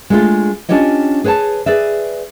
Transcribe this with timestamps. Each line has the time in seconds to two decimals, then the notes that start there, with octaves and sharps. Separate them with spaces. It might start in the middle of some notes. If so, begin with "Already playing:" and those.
0.10 G#3 A3 D4 D#4 F4 G#4
0.69 C#4 D4 F4 G4 C#5 D#5
1.24 G#4 B4 C#5 G#5 A5
1.66 G#4 B4 D5 E5